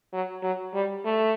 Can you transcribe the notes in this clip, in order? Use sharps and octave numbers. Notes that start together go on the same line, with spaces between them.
F#3
F#3
G3
A3